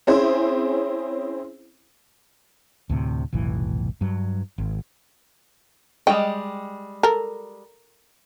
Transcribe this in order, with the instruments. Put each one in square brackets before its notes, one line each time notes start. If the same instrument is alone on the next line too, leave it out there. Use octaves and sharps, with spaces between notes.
[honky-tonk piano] C4 C#4 E4 G#4 C5
[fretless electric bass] D2 A2 C3
F1 B1 A2 E3
G2 F#3
G#1
[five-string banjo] G3 G#3 G5 [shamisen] D#5
[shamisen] A4 A#4